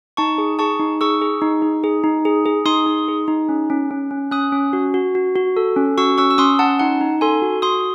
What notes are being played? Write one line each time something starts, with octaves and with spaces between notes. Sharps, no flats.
D#4 A5 C#6
G#4
G#4 A5 C#6
D#4
G#4 C#6 E6
G#4
D#4
D#4
G#4
D#4
G#4
G#4
D#4 C6 D#6
D#4
G#4
D#4
C#4
C#4
C#4
C#4
C#4 D#6 F#6
C#4
F#4
F#4
F#4
F#4
A4
C#4
F#4 C#6 E6
C#4 C#6 E6
E6
C#4 C6 D#6
C#4 F#5 A5
D#4 F#5 A5
D#4
A4 G#5 C6
F#4
F#4 C6 D#6